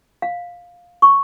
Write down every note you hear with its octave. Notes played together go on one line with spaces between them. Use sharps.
F5
C#6